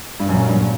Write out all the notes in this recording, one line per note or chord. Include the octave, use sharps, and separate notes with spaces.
G2
F#2 A#2 F#3 C#4
G2